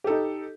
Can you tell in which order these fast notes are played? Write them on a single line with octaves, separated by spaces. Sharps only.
G4 A4 D#4